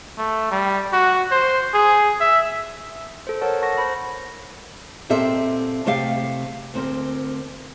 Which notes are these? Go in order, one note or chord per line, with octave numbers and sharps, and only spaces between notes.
A3
G3
F#4
C5
G#4
E5
A4 C5
A4 A#4 C#5 F#5 A5
F#5 A5 C#6 A#6
C5 B5
A#2 C4 G4 A4 E5
C3 A3 G4 F5
D2 C4 A#4